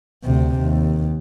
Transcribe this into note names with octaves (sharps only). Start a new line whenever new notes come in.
D2 C3
D#2